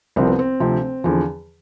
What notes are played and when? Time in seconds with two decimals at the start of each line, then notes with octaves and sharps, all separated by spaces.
0.16 C2 C3 F3 C4
0.27 B3
0.39 C4
0.60 D2 C3 F3
1.04 E2 D3 F3